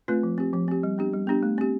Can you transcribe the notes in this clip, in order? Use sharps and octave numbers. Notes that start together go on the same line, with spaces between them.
A3 C4 F4 B4
F3
C4 G4
F3
C4 G4
G3
B3 D4 G4
G3
B3 D4 G4
A3
C4 G4